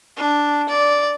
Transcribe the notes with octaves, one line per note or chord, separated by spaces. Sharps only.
D4
D5